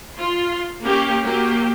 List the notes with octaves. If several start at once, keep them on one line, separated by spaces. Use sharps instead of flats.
F4 C6
A#3 C#4 G4
F#3 A#3 G4